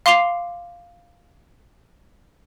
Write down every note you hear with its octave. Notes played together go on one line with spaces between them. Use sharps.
F5 C6 D6 C7 F7 G7